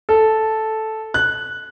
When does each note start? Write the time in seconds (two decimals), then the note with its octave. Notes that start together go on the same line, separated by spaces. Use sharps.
0.09 A4
1.14 F#6